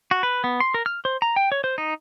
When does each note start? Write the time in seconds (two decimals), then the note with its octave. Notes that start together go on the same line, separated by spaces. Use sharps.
0.11 F#4
0.23 B4
0.44 B3
0.60 C6
0.74 A#4
0.86 F6
1.05 C5
1.22 A#5
1.36 G5
1.52 C#5
1.64 C5
1.78 D#4